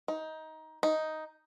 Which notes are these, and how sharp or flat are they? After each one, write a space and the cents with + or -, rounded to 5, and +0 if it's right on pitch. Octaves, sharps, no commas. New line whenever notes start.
D#4 +20
D#4 +5